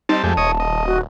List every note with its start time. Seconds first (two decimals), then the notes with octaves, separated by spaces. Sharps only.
0.09 G3 C4 D#4 A5
0.24 F2 G#3 A3 G4 A5
0.37 D#1 C#5 D#5 D#6
0.60 D#5
0.87 F#4